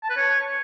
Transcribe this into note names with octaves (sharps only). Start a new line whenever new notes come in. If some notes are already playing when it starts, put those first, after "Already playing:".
A5
B4
C#5